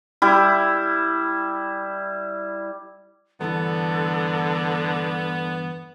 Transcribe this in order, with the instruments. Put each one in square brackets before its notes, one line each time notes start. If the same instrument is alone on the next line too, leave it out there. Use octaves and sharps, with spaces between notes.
[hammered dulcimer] G3 E4
[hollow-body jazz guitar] E2 G2 E3 [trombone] D3 [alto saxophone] B3 [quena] A4